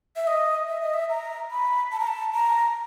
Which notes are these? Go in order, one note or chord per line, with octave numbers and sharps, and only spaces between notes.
E5
D#5
E5
D#5
E5
A#5
B5
A5
A#5
A5
A#5